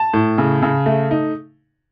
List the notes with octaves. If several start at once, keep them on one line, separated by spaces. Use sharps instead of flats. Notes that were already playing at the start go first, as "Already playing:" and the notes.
Already playing: A5
A2
C#3
C#3
A3
D#4